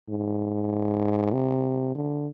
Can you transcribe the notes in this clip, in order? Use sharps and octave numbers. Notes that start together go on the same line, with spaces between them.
G#2
C3
D3